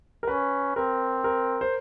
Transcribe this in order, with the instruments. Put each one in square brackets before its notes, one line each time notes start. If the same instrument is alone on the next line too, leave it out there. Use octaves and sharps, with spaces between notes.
[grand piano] A#4
[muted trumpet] C#4 [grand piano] B4
[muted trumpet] C4 [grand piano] A#4
[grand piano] A#4
C5